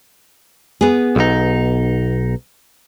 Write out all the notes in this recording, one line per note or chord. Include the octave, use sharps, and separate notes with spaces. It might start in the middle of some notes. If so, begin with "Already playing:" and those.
B3 G#4
B1 D#4